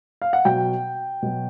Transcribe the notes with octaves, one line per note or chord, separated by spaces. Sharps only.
F5
F#5
B2 F#3 G5
B2 F#3